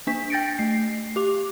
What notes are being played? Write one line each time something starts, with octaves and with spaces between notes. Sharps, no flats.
A#3 D4 B6
G5 G6 A6 A#6 C#7 D7
A3 C7
G4 D6 F7